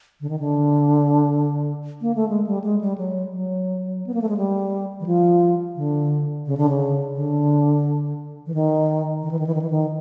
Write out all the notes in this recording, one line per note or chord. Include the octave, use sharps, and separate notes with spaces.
D3
D#3
D3
A#3
A3
G#3
G3
G#3
G3
F#3
F#3
B3
A#3
A3
G#3
G3
E3
F3
D3
C#3
D3
C#3
D3
E3
D#3
D#3
E3
D#3
E3
D#3
E3
D#3